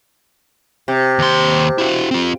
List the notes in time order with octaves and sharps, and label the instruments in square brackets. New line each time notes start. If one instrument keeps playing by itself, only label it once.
[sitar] C3
[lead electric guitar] D#2 C6
E4 F#4
C4 F4